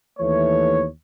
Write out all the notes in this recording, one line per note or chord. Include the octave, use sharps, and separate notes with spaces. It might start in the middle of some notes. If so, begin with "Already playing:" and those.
D#2 E3 A3 C#5